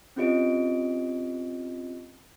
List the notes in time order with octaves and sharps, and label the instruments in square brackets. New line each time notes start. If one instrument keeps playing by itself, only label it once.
[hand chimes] C4 C#4 F4 G4 D#5 D7